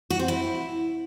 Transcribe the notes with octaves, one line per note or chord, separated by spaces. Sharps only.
F#4
C4
E4